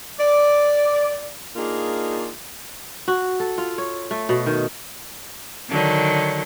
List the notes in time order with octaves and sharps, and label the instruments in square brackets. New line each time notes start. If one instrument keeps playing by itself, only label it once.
[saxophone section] D5
A#3 D4 D#4 F4 G#4
[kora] F#4
A4
F4
C#5
A3
B2
D#3
[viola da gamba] D3 D#3 F#3